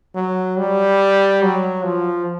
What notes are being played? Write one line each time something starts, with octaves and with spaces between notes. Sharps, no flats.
F#3
G3
F#3
F3